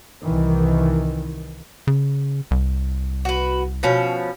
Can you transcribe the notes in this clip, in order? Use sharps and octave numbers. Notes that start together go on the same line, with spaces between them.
C2 D#3 E3
C#3
C2
F#4 B4
B2 F3 C#4